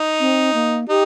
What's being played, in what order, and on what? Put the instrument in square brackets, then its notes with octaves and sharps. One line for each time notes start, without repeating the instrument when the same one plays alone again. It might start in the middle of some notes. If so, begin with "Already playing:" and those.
Already playing: [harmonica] D#4
[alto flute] C4
A#3
[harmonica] D#4 [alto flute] G4